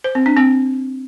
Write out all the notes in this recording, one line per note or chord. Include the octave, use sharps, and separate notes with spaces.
C5
C4
D4
C4